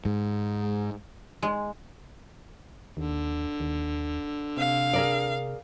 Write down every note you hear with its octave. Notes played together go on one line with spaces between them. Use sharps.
G#2
G#3
D#2 D3
D#2
C3 F5
G#4 A#4 D5